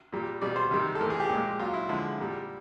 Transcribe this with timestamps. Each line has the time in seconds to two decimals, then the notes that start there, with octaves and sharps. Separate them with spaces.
0.12 A#2 G3
0.41 B2 G3 D5
0.56 C5
0.71 C3 D#3 G3
0.95 A4
1.00 A2 E3 G3 A#4
1.10 G#4
1.20 G4
1.30 A#2 F3 G#3
1.59 A#2 F#3 F4
1.74 E4
1.89 D3 F3 G#3 E4
2.18 A#2 G3